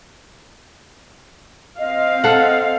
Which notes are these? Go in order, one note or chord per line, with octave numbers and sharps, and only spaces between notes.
C4 D#5 F5
A4 F#5